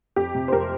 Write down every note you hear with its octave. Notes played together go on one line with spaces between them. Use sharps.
F2 G4
C3
C5
F2 G4 A#4